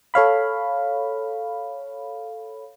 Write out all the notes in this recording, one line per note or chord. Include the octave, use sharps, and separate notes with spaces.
A4 C#5 F5 B5